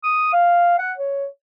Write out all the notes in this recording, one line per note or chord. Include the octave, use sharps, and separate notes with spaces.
D#6
F5
F#5
C#5